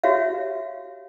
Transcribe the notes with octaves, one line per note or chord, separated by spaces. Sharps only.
F#4 G4 C#5 E5 F5